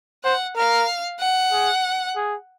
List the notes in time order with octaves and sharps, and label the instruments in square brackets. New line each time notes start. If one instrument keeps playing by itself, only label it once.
[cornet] C5 [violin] F#5
[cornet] A#4 [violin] F5
[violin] F#5
[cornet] G#4
G#4